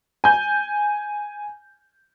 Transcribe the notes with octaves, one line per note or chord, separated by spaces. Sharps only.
G#5 G6